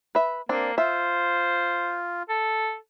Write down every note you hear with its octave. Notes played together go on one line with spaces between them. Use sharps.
B4 E5
A#3 C4 D4
F4 C5 E5
A4